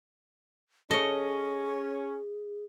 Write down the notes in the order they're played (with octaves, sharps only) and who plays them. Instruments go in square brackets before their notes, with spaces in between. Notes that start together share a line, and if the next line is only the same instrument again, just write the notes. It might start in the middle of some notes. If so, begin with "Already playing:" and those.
[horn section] C#4 [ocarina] G#4 [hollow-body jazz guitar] A4 C#5 [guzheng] D#5